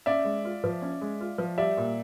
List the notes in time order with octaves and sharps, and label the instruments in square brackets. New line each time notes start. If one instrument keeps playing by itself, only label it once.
[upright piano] C#4 [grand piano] D5 E5
[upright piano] G#3
F4
F3
C#4
G#3
F4
F3
[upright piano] G3 [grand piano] D5 E5
[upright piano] A#2